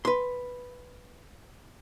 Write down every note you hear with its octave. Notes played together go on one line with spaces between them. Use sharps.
B4 C6